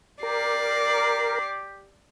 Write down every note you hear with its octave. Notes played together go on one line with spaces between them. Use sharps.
G4 A#4 D5 C7